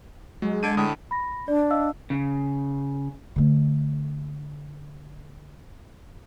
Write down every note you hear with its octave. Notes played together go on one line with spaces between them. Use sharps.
F#3 G#3
D3 G#6 D7 D#7
A2 D3 D#6
B5 A#6
D4 D5
D#5 F5 E6
C#3
D3 A3